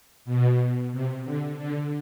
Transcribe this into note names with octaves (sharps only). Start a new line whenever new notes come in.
B2
C3
D3
D3